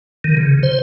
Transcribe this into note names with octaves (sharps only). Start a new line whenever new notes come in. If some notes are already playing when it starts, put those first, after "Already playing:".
D#3
C#3
C5